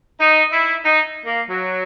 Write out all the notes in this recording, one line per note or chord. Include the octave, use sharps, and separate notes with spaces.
D#4
E4
D#4
A#3
F#3